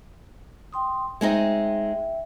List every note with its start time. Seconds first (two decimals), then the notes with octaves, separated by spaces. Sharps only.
0.73 G5 C6 D#6
1.21 G#3 C4 D#4 E5 G5